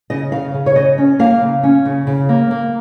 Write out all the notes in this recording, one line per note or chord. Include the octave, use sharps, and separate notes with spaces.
C#3 D#5
C#3 F5
C#3
C#5
C#3 D#5
C#4
A#3 F5
C#3
C#4
C#3
C#3
A#3
A#3